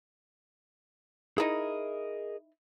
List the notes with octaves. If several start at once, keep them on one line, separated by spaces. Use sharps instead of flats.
D#4 E4 G#4 A#4 D#5